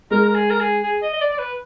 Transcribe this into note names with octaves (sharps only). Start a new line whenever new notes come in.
G#3 A#4
A#4
G#4
A#4
G#4
G#4
D#5
D#5
D5
D5
B4